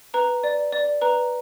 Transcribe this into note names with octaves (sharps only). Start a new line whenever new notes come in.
B4 A#5
D5
D5
B4 A#5